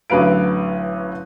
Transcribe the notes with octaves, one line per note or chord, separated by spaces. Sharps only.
A1 D3 F#3 B4 F5 D7